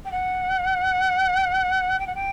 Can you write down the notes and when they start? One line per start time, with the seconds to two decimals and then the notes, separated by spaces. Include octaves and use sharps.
0.05 G5
0.11 F#5
1.99 G5
2.07 F#5
2.15 G5